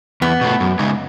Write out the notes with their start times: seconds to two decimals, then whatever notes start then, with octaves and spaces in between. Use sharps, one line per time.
0.21 E2 B3
0.41 B2 A3
0.60 F#2
0.79 C#3 G#3 D#4